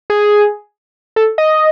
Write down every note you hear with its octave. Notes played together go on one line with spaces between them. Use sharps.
G#4
A4
D#5